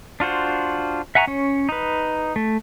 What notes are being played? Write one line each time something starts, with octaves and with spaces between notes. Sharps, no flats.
D4 F4 F#4 C5
E5 F#5 G#5 A#5 C#6
C#4 C#5
D#4 B4
A3